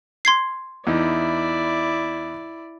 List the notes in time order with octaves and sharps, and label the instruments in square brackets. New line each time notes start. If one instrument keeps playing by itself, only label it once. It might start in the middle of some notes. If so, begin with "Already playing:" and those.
[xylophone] C6 G#6 C7
[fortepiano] E2 D#4 [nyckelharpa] E4 D5